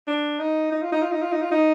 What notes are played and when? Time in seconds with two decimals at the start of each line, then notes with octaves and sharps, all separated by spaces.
0.07 D4
0.39 D#4
0.72 D#4
0.82 F4
0.92 D#4
1.02 F4
1.12 D#4
1.21 F4
1.32 D#4
1.41 F4
1.51 D#4